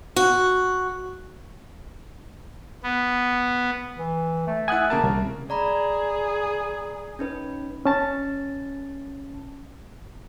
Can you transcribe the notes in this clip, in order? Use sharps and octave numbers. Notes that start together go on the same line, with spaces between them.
F#4
B3
E3
A3
E4 F#5 G#5 D#6 F#6
C#3 A#3 A#4 A5
C2
G#4 D5 A#5 B5
C#4 D#4 B4
C#4 A5 A6